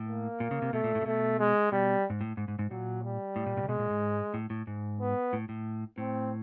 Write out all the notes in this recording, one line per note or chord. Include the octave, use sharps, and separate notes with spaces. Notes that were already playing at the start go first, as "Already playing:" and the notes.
Already playing: A2
A#3
A#2
C#3
C3
B2 A3
A#2
A2
A#2
B2 A3
G#3
B2 G3
G#2
A2
G#2
G#2
G#2
A#2 F#3
G3
A2
A#2
A#2
C3
B2 G#3
A#2
G#2
A2
A2
G#2
B3
A2
A2
A2 C4